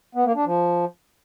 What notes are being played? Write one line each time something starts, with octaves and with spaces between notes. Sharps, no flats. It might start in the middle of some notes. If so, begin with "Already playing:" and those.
B3
A#3
D4
F3